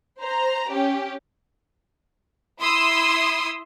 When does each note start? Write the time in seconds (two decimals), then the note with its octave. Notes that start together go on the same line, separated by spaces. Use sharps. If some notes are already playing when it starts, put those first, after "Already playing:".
0.20 C5 A#5
0.68 C#4 G4
2.61 E4 C6 D#6 E6